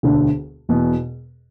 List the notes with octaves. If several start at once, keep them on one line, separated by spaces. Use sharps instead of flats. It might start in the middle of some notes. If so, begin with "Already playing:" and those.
E1 D2 D3
E1 E2 B2